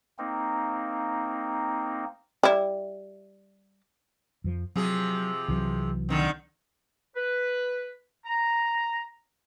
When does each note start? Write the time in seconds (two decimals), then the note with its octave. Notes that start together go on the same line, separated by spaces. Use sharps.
0.18 A#3 C4 D#4
2.43 G3 E4
4.44 F2 F3
4.76 C3 F3 F#3 G#4
5.48 C2 E3 F#3
6.09 D3 D#3 C4
7.16 B4
8.25 A#5